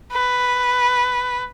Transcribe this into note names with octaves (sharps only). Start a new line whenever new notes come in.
B4